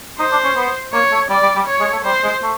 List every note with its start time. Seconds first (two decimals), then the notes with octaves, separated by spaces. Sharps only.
0.19 D#4 C5
0.32 D4
0.44 C#4
0.56 B3
0.93 A#3 C#5
1.12 A3
1.30 G3 D5
1.42 G3
1.56 G3
1.68 C#5
1.80 G#3
1.92 A3
2.05 G3 C5
2.24 G#3
2.43 A3